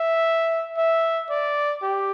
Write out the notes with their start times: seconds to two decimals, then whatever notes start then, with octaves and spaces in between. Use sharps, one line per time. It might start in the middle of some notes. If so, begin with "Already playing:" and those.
Already playing: E5
0.77 E5
1.30 D5
1.82 G4